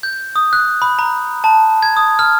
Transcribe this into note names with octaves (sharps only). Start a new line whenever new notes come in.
G6
D#6
F#6
B5
A#5
A5
G#6
D#6
F6